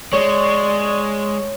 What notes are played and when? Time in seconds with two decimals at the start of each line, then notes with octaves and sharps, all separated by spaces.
0.13 G#3 C#5 D5